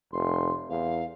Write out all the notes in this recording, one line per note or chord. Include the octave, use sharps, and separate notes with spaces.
F1 C6
E2 F5